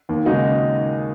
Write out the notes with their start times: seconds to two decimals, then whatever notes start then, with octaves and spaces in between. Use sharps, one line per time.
0.09 D#2
0.25 C#3 G#3 D#4 F#4